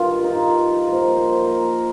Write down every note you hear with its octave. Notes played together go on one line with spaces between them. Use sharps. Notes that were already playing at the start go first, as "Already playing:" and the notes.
Already playing: G2 D#3 F4
D#4
F4
A#2 F3 A#4
C5
A#4